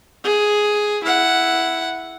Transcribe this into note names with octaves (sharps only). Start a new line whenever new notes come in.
G#4
E4 F#5